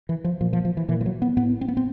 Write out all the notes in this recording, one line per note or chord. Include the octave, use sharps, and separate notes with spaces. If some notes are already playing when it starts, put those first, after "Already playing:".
E3
F3
A#2 F3
F3
F3
E3
A#2 E3
F3
F#3
B3
A2 B3
C4
B3
C4